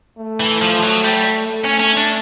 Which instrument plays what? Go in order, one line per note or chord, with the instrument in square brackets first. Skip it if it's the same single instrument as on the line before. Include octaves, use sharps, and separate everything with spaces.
[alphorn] A3
[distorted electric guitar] E3
F3
F#3
G3
[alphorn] A3
[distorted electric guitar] C#4
C#4
D4